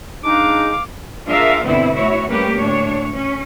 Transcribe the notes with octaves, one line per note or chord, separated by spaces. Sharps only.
G#3 D4 D#4 F5 D6
D4 F4 G#4 A#4 E5 F5
G2 B2 D3 B3 C4 E4
D2 E4 F#4 C#5
G3 A3 A#3 C#4 G4 B4
D2 A2 D4 C#5
C#4